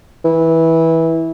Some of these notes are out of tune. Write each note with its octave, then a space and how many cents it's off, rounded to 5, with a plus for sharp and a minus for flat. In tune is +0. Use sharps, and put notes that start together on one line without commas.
E3 -15